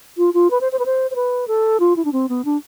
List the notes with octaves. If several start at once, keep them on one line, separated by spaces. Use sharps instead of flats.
F4
F4
B4
C5
C5
B4
C5
C5
B4
A4
F4
E4
D4
C4
B3
D4